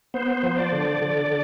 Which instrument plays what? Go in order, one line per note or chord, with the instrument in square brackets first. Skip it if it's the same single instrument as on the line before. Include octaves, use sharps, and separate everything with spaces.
[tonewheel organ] B3 C5
F3
D5
D3
D3